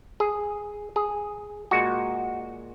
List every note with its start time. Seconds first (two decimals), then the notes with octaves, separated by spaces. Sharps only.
0.20 G#4
0.96 G#4
1.71 A#2 G#3 F#4